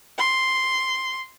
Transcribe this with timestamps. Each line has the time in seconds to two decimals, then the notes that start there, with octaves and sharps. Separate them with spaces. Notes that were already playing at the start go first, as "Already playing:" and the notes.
0.18 C6